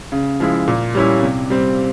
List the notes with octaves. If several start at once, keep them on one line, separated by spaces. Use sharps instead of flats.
C#3
F3 G#3 E4
A#2
G3 C#4 E4
C3
G3 C4